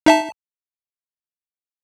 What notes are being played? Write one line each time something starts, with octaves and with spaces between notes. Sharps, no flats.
D#4 E5 A5